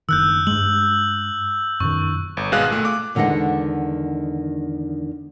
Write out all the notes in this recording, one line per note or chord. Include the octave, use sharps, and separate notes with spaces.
F#1 D#3 E6 F#6 G6
G2 G#3 F#7
F#2 A#2 D#3 C#6
G1
G#1 B2 G#3 G#4 F5 F#6
A#2 A3
D6
E2 D3 D#3 G#3 D#5 F#5